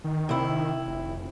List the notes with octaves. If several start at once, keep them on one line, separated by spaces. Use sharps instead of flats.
D#3
C3 E4
F1